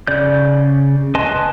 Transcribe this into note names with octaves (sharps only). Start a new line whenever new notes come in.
C#3 D5 G6
B4 D#5 G#5 A5 C6